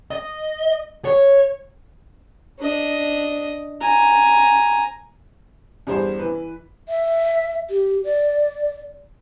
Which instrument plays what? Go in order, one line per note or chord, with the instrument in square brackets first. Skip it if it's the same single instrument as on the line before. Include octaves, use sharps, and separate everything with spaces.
[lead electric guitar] D#5
C#5
[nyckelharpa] D4 D#5
G#5 A#5
[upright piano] E2 G2 G#4 C5
E3 B4
[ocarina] E5
G4
D5